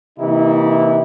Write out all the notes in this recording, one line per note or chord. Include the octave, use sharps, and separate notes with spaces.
C3 E3 A#3 D#4 E4 G4